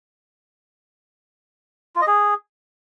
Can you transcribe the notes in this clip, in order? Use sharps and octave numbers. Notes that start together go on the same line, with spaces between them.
F4
D#5
G#4